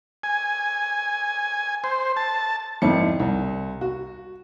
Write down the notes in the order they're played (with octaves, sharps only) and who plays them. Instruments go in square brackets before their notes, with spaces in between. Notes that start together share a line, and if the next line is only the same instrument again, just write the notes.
[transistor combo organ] G#5
C5
A5
[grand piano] G#1 F2 E4 C#7
C2
F#4